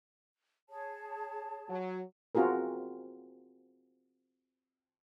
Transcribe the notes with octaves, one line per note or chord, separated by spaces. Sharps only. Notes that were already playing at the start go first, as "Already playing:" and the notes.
G#4 C#5 A5
F#3
C4 F4 F#4 G#4 A#4